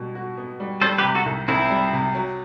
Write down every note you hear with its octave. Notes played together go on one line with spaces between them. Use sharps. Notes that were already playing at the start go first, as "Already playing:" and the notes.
Already playing: B2 G3
F#4
B3
G3
G3 A4 C5
G4 B4
C3
F#4 A4
C2
C2 C4 E4
G3
C3
F#3